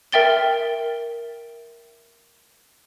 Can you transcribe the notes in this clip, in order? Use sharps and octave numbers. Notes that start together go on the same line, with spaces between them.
A#4 E5 G5 A6 G7